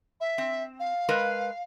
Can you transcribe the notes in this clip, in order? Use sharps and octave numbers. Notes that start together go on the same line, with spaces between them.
E5
C4
F5
G#3 A#4 B4